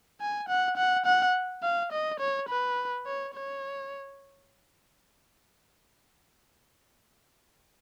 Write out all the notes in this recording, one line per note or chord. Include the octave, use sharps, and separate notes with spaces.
G#5
F#5
F#5
F#5
F5
D#5
C#5
B4
C#5
C#5